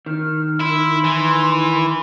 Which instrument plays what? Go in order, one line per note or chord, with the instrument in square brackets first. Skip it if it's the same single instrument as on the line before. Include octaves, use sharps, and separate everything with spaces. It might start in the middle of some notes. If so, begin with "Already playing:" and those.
[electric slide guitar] D#3 [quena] F6
[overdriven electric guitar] E4 [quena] C6
[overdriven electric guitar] E3